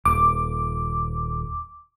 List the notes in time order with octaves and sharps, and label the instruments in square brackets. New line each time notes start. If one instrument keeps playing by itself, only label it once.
[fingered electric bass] D#1 [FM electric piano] D6